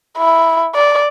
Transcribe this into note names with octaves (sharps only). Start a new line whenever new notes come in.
E4
D5